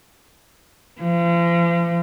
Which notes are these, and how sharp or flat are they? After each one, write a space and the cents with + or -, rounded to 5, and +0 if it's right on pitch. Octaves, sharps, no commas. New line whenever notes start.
F3 -40